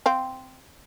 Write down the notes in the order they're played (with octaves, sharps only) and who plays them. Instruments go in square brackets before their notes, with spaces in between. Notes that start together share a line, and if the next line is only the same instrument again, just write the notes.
[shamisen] C4 F5